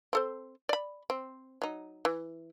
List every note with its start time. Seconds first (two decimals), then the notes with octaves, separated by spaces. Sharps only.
0.13 C4 A4 C5
0.69 D5 B5
1.10 C4
1.62 F#3 D#4
2.05 E3